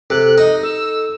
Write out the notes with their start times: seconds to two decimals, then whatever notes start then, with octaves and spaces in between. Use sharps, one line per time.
0.10 C3 A4 F#6
0.38 D#4 D#5
0.63 A4 E6